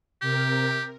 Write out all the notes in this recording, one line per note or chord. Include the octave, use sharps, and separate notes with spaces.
C3 G4 A#4